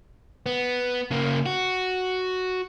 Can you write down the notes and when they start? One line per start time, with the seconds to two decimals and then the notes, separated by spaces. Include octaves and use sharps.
0.46 B3
1.11 C#3 A#3
1.46 F#4